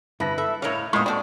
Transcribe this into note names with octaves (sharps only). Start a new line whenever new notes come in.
G2 D3 E4 B4 A5 A#6
A4 E5
A2 E4 A#4 C#5 D#5 F5
A2 G#3 A#3 B3 F4 D#5 C#6 D#6
C4 D4 F#4 A4 D5